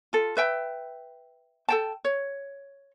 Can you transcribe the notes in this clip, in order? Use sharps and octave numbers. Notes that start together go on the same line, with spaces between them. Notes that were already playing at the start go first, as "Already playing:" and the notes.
F4 A4
B4 E5 G5
A4 G5 A5
C#5